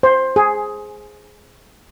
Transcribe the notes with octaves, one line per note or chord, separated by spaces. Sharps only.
C5
G#4